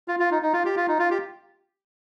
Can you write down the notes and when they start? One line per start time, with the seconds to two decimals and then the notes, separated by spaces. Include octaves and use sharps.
0.08 F4
0.20 F4
0.31 D#4
0.43 D#4
0.53 F4
0.65 G4
0.76 F4
0.88 D#4
0.99 F4
1.11 G4